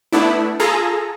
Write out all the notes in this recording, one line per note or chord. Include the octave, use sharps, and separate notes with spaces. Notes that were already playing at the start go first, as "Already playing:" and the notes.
A3 B3 D4 E4
F4 G#4 A4 A#5